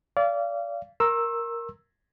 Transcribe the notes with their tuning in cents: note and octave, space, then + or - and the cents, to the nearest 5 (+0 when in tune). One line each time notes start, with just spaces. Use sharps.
D5 -30 F5 -25
A#4 +0 C6 +45 E6 +0